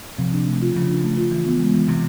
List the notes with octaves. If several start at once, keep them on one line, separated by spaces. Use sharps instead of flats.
C3 F3
D4
A3
F4
C#3 F3
D4
A3
F4
E3
B3
G#3
E3
C3 E3